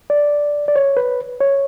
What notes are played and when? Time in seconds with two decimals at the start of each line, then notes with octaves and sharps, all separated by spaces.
0.10 D5
0.68 D5
0.76 C#5
0.97 B4
1.40 C#5